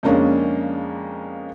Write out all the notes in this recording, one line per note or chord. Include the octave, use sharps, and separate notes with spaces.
F2 C#3 G#3 A#3 C#4 D4